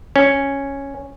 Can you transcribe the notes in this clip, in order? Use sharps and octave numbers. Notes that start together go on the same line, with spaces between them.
C#4